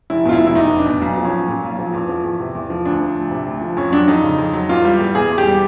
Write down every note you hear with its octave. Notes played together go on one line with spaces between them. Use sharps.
F1 E4
B2 F4
E4
F1
E4
E2 D#4
F1
D4
B2
B1
F3
C#4
B1
A#2
B1
F3
E2
F3
E2
C3
E2
F3
D2 D4
F3
D2
C3
D2
F3
F2 C#4
F#3 D4
F2 D#4
C#3
F2
F#3
E2 F4
G3
E2
B2 G#4
E2
G4
G3